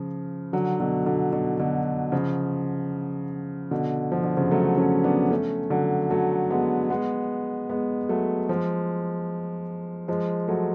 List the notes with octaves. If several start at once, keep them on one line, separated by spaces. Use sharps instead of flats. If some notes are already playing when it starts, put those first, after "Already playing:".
Already playing: C#3 F3
D3 F#3
B2 D3
B2 D3
B2 D3
B2 D3
C#3 F3
B2 D3
F3
D3
C#3 F3
F#3 A3
A3 C#4
B3 D4
A3 C#4
D3 F#3
F#3 A3
G#3 B3
G#3 B3
G#3 B3
F#3 A3
F3 G#3
F3 G#3
F#3 A3